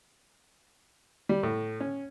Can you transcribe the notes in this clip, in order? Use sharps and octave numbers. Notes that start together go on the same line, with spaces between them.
G3
A2
C#4